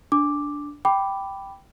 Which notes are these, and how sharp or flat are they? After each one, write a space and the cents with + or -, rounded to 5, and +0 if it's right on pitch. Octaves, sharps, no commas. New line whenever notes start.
D4 -10 D6 +0
G5 +0 B5 +0 D6 +0